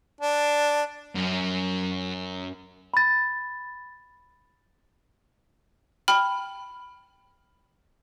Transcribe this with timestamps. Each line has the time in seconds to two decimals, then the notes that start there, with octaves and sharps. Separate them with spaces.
0.21 D4
1.16 F#2
2.94 B5 A6
6.08 G5 B5 F6